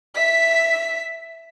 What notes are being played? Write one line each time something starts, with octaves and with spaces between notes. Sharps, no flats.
E5 B6